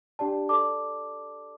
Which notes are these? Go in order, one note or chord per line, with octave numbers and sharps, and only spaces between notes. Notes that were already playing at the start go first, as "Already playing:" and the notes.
D4 G4 D5 A5
A4 D5 A5 D6